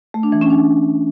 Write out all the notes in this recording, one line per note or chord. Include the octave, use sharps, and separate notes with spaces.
A3
D4
E3
C#4
D4